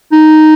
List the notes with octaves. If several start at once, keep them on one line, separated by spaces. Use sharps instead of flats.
D#4